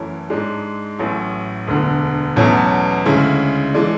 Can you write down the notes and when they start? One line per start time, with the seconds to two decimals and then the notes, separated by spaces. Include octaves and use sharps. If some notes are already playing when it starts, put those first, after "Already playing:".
Already playing: F#2 E3 A3 C#4 E4
0.30 G#2 G#3 D4
0.99 A1 A2 F#3
1.68 E1 D2 D3
2.36 E2 B2 F#3 A3 C#4
3.06 D2 C#3 G#3 C#4 E4
3.74 E3 G#3 D4